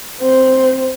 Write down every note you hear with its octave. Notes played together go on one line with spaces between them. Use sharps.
C4 C5